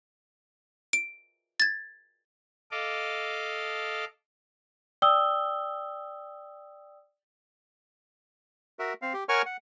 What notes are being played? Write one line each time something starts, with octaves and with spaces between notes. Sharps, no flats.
D7
G#6 A6
A4 D#5 F5 D6
D5 G5 D#6 E6 G7
F#4 A#4 E5
C4 F5
G4
A#4 C#5 F#5 G#5 C#6 F6
F#5